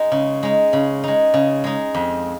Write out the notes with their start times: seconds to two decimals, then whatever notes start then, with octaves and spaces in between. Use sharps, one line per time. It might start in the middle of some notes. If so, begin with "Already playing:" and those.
Already playing: G#3 D#4
0.12 C#3
0.43 G#3 D#4
0.73 C#3
1.04 G#3 D#4
1.34 C#3
1.64 G#3 D#4
1.95 F2